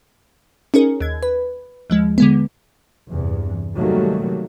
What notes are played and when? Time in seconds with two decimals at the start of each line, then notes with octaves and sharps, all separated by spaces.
0.74 C#4 D#4 G#4 A#4
1.01 D#2 G#6
1.23 B4
1.90 D#2 F3 G#3
2.18 D3 G#3 B3
3.09 E2 G2 C3
3.76 C3 D#3 F#3 G3 A3 A#3